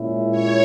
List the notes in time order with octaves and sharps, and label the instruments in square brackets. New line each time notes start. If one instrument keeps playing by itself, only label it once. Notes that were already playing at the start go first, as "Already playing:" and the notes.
Already playing: [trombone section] A#2 G#3 C#4 E4
[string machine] C#5